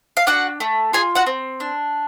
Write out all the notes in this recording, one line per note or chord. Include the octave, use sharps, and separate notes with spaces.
F5
D4 F#4 F#5
A3
F4 G#4 G#5
F#4 F#5
C4
D4